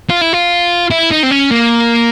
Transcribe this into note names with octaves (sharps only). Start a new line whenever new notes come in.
F4
E4
F4
E4
D#4
C4
C#4
A#3